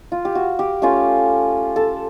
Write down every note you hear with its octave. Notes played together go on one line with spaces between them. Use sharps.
F4
G4
F#4
G4
A3 C#4 F4 G4
A4